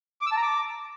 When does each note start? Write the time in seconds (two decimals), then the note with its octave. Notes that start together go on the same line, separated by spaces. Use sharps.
0.21 D6
0.26 E6
0.32 A5
0.37 A#5
0.42 D6